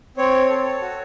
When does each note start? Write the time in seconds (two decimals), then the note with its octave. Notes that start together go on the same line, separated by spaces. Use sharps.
0.17 C4 C#5
0.50 A4
0.81 F#4